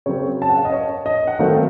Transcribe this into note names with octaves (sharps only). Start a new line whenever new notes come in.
C#3 F#3 C4 C#5
A5
F#5
F5
D#5
C#5
D#5
F#5
D#3 F#3 A3 C4 F5